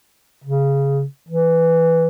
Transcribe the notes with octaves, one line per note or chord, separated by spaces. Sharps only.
C#3
E3